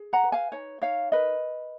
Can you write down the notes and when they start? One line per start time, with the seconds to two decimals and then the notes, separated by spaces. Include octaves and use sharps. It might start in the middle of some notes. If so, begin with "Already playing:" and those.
Already playing: G#4
0.13 F#5 A#5
0.23 B4
0.32 F5 G#5
0.52 D#4 C#5
0.82 D#4 C#5 F5
1.12 A#4 B4 D#5